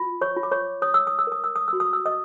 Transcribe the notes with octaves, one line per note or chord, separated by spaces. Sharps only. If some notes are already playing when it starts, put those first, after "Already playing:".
Already playing: F4
C#5 C#6
F4
D6
C#5 C#6
C#5 D#6
E6
D#6
E6
A#4 D#6
E6
D#6
F#4 E6
D#6
E6
D#5 D#6